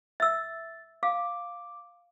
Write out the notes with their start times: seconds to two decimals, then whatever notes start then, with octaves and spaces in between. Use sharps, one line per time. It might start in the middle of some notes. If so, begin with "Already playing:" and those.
0.20 E5 E6 A6
1.03 F5 D6